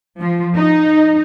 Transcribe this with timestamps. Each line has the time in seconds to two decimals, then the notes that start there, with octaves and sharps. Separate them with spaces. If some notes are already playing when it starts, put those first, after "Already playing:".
0.20 F3
0.56 D#4